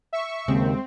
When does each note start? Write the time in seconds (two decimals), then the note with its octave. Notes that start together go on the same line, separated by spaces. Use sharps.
0.13 E5 C#6
0.48 D#2 C#3 G#3 C4